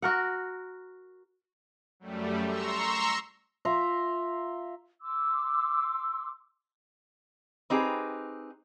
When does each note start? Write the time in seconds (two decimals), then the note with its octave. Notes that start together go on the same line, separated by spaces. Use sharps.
0.02 F#4 A#4 F#5
2.00 F#2 G3 A3
2.47 A#5 C6 C#6 E6
3.65 F4 E5 A#5 C6
5.02 C6 D6 E6
7.70 C4 D#4 G4 G#4 B4